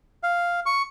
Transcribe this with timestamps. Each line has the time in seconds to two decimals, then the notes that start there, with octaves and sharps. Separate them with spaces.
0.23 F5
0.66 C#6